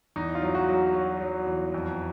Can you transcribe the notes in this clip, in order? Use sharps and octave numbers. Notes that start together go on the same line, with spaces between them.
E2 D#4
F4
F#3
F#4
F#3
F#4
F#3 F#4
F#3
E2
F2